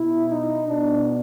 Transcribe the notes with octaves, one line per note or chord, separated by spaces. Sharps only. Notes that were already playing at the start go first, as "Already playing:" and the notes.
Already playing: B2 E4
D#4
B2 D4